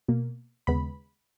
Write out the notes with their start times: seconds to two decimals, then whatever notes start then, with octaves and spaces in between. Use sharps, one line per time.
0.08 B2 A#3
0.67 D#2 C#3 G#3 B3 B5